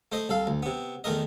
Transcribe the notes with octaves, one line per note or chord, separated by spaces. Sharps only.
A3 C5 D#5
C2 A4 F5
D2
C3 B3
E2 D#3 A3 A#4 D#5